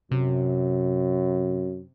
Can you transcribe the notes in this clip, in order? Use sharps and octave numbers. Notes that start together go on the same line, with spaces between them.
F#2 C3